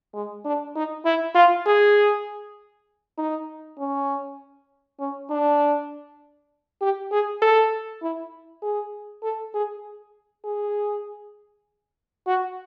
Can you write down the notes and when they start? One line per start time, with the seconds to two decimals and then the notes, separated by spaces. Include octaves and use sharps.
0.15 G#3
0.45 D4
0.75 D#4
1.05 E4
1.35 F4
1.66 G#4
3.18 D#4
3.78 C#4
5.00 C#4
5.30 D4
6.81 G4
7.12 G#4
7.42 A4
8.02 E4
8.62 G#4
9.23 A4
9.54 G#4
10.44 G#4
12.27 F#4